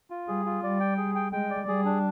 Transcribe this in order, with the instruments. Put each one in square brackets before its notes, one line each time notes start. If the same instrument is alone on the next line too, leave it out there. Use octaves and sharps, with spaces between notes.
[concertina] F4
[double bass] G3 [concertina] G#4
[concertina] F4
[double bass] G3 [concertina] D5
[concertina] G5
G#4
G5
[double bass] G#3 [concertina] G5
[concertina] D5
[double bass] G3 [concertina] G#4
[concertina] D4